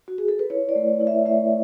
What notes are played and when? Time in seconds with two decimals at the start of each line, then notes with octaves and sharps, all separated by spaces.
0.08 F#4
0.18 G#4
0.28 A4
0.39 B4
0.50 E4 C#5
0.69 D5
0.75 A3
1.00 E4
1.07 E5
1.26 A3 E5